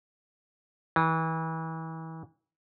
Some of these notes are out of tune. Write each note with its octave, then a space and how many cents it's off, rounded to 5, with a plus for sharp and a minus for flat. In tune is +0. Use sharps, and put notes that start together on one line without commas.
E3 -30